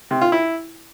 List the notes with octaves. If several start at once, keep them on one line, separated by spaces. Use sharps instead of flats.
C3
F4
E4